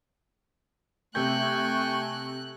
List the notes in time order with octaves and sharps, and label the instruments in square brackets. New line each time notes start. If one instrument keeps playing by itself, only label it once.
[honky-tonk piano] C3 G6 [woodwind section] A3 [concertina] G5 G#5 C#6 [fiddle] F#6